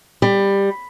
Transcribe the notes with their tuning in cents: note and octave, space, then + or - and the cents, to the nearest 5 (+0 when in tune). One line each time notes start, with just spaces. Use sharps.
G3 +15